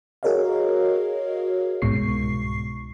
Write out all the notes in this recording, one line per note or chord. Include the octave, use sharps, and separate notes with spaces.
F#4 G#4 A#4 C#5 D#5 F5
C2 G#2 B2 C#6 C7